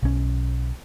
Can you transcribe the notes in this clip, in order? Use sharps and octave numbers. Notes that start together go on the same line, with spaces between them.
B1 C#4